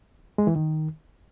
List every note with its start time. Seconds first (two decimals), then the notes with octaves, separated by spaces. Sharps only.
0.38 G#3
0.47 E3
0.56 D#3